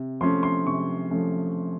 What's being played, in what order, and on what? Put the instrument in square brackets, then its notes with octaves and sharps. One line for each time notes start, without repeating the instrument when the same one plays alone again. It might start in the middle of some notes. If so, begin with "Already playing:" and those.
Already playing: [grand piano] C3
F3 A3 C#4 C6
C6
C3 C#6
F3 A3 C#4